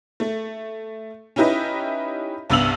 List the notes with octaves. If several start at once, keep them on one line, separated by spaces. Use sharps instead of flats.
A3
C#4 D#4 E4 G4 B4 D#5
C2 G2 B3 E6 F7 F#7